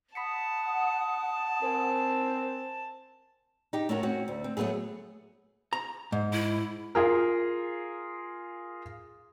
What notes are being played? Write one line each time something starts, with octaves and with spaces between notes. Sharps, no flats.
F#5 A5 B5 D#6 B6 C#7
C4 A#4 C5 G#5
D#4 G4
A3 C#4 F#4 A#4
C4 C#4 F#4
D2
C4
F#3 G#3 A3 B3 G#4
A#5
G#2
E4
F4 G#4 A#4